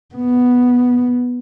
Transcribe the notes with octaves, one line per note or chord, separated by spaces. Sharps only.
B3